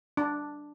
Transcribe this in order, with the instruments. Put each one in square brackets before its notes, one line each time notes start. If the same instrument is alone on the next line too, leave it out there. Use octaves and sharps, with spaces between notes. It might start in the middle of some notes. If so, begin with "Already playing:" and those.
[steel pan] D4